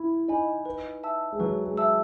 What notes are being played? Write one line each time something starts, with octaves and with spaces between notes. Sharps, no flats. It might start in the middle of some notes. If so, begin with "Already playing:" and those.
Already playing: E4
D#4 D#5 G#5 B5
B4
E5 A5 E6
G#3
F#3 B4
G#3
E5 A5 E6